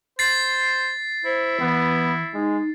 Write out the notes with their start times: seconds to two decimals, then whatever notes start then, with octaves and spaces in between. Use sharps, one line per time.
0.19 C5 A6 C7
1.25 E4 C5
1.60 E3 B3
2.34 G#3 D#4